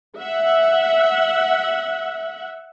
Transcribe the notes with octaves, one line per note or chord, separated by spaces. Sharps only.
E5 F#5